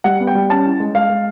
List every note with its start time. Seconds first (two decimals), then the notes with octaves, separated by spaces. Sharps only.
0.04 G3 F#5
0.20 B3
0.27 G5
0.35 G3
0.50 C#4 A5
0.65 E4
0.80 G#3
0.95 G#3 F5
1.09 G#3